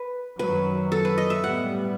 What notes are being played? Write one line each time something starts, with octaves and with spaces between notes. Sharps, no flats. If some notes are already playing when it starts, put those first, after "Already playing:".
Already playing: B4
F#2 D#3 F#3 B4
A4
B4
D#5
E5
A2 G3 B3 F#5